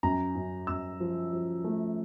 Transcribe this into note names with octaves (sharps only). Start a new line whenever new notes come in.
F#2 A#5
F#2
F#2 E6
F3
F3
A3